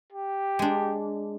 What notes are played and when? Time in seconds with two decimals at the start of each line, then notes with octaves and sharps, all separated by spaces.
0.12 G4
0.59 G#3 D4